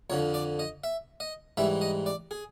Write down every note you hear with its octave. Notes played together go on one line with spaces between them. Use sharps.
F2 D3 F3 C#5
D5
D#5
E5
D#5
G#2 E3 G3 E5
D#5
D5
G#4